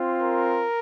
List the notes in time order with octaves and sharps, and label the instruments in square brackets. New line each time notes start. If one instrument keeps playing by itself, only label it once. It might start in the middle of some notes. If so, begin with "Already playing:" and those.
Already playing: [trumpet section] C4 F4
A#4